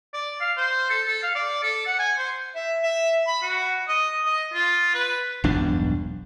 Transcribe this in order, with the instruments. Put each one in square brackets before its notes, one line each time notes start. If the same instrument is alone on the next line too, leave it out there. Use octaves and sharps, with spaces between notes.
[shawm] D5
F5
C5
A4
A4
F5
D5
A4
F#5
G#5
C5
E5
E5
B5
F#4
D#5
D#5
F4
B4
[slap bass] E1 B1 G2 D4